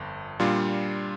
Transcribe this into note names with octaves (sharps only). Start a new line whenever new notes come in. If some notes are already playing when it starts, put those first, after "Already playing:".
Already playing: G1 F2
A#2 G3 D4 F4